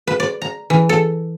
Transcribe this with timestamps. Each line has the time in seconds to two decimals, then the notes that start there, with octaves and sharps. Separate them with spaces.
0.07 B4
0.20 D5
0.42 A#5
0.70 E3
0.89 A4